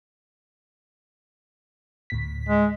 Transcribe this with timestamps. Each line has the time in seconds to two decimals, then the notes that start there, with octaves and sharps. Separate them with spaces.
2.10 D2 A2 B6
2.49 G#3